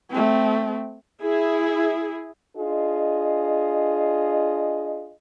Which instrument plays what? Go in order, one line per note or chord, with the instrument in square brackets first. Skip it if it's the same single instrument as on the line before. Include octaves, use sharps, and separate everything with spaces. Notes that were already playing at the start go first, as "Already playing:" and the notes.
[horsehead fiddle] A3 C4
[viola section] E4 G#4
[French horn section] D4 F4 G#4 D#5